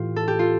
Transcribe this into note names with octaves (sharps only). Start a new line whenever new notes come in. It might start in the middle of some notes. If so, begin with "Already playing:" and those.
Already playing: A2 E3 F4 G4
A4
G4
F4